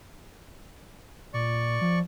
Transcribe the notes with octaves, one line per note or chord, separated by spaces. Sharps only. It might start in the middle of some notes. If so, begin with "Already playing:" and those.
A#2 D5 C#6
F3